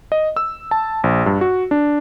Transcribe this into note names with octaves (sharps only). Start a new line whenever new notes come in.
D#5
E6
A5
A#1
G2
F#4
D4